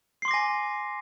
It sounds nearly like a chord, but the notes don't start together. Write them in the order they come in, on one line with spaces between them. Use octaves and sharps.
C7 C6 D6 A#6 G#5